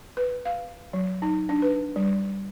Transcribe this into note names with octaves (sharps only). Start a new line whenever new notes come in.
B4
F5
F#3
D#4
D4
B4
G3